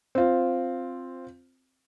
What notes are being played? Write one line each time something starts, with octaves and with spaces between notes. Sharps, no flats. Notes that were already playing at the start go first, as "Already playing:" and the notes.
C4 F4